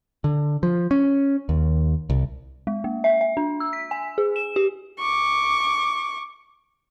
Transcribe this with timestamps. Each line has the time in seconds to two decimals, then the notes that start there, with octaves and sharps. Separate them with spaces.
0.24 D3
0.63 F3
0.91 C#4
1.49 D#2
2.10 C2
2.67 G#3
2.84 A#3
3.04 E5
3.21 E5
3.37 D4
3.60 E6
3.73 B6
3.91 G#5
4.18 G#4
4.36 E7
4.56 G4
4.99 C#6 D6